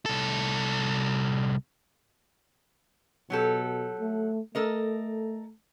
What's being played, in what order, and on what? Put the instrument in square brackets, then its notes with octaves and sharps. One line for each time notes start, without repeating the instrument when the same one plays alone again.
[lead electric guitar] C2 A4
[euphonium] B2 [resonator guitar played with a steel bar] F#3 G4 A4
[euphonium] A3
[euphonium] A3 [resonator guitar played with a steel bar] A4 A#4 D#5